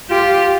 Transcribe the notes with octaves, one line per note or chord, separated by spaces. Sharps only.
F4 G4